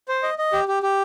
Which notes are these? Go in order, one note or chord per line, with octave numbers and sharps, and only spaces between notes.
C5
D#5
D#5
G4
G4
G4